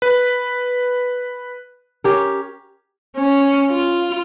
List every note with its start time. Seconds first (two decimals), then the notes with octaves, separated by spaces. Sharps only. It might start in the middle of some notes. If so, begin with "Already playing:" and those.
0.02 B4
2.04 C#4 G4 A#4
3.17 C#4
3.70 F4